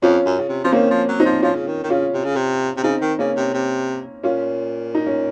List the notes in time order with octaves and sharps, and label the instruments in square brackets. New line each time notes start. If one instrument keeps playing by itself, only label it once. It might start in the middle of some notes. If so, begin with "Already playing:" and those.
[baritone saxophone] F2 [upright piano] C#4 F4
[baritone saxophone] F#2
C#3
C3
[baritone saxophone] F3 [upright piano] C4
[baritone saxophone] D#3 [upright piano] A#3 C#4
[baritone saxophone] F3
F#3
[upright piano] C4 D#4
[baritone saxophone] F3
[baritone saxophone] F3 [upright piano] C#4 F4
[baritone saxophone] C#3
D#3
D#3
[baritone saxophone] C#3 [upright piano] C#4 F4
[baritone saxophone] C3
C#3
C3
C3
[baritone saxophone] C#3 [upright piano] C4 D#4
[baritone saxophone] D#3
[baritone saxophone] C#3 [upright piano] A#3 C#4
[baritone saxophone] C3
C3
[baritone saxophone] A#2 [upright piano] C#4 F4
[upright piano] D#4
C#4